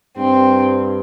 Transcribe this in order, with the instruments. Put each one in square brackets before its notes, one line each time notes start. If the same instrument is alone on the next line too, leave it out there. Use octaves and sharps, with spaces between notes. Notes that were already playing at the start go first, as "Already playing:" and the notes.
[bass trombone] G2 [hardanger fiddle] C4